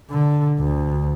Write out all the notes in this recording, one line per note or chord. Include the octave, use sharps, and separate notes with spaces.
D3
D2